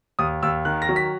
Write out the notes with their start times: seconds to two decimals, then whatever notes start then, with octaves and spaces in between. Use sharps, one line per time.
0.19 D#2 D#6
0.43 D#2 E6
0.65 D#3 F#6
0.82 A#6
0.89 F#3
0.96 B6